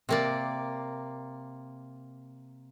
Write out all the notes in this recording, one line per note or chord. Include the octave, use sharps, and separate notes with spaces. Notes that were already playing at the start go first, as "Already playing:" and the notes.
C3 A#3 D5